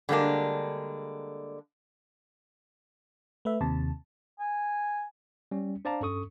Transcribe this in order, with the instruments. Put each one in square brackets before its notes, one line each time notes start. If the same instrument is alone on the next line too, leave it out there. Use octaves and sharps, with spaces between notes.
[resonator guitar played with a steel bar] D3 G3 G#3 A#3 D4
[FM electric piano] A3 B4 E5
D#2 C3 A5
[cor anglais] G#5
[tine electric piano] G3 C#4
D4 C5 D5 F5 A5 A#5
G2 C#4 A4 C#6 D#6